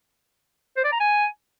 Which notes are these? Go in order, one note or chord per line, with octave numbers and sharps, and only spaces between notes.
C5
D5
A#5
G#5